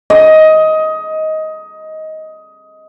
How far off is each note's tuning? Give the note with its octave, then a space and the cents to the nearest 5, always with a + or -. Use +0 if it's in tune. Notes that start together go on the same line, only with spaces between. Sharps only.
D#5 +15